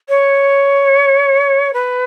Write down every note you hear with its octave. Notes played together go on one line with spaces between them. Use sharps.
C#5
B4